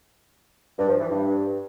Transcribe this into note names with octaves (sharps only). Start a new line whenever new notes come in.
G2
F3
E3
G2